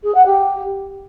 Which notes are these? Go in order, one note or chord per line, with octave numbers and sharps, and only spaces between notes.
G#4
F#5
G4